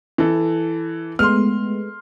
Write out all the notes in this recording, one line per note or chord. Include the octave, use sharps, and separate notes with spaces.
E3 A4
G#3 A3 B3 C6 F6